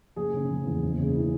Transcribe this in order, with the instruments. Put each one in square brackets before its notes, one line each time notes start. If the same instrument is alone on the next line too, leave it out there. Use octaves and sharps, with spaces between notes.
[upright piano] F#1 G#4
C#3
F#1
E2
F#1
C#3
E3